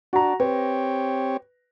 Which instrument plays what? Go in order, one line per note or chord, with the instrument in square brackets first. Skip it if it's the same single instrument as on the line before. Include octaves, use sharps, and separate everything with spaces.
[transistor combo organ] D4 [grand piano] F#4 A#5
[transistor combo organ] C4 G4 C#5 [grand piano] B4